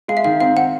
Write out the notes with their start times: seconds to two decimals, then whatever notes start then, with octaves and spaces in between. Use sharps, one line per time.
0.08 G#3 F5
0.17 E5
0.24 D#3 F5
0.41 C4 F5
0.56 C4 F#5